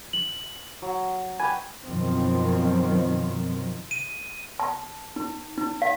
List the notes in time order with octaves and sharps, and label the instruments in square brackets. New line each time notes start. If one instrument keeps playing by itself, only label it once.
[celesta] F#7
[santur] F#3
[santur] B4 D5 G5 [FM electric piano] G#5
[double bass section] F#2 B2 D#3 F3 C4
[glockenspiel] D#7
[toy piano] A5
D#4
D#4
F5